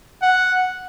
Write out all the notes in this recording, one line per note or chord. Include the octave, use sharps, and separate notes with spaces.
F#5